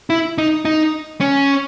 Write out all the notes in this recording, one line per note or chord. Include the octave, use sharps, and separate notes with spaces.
E4
D#4
D#4
C#4